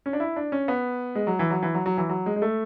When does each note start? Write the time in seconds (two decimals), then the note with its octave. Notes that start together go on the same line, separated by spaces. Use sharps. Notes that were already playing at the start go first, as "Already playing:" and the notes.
0.06 C#4
0.13 D4
0.20 E4
0.36 D4
0.52 C#4
0.68 B3
1.15 G#3
1.27 F#3
1.39 E3
1.50 F#3
1.62 E3
1.74 F#3
1.86 F#3
1.98 E3
2.09 F#3
2.26 G#3
2.36 G#3
2.42 A3